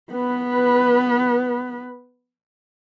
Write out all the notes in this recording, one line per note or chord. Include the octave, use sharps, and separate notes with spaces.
B3 B4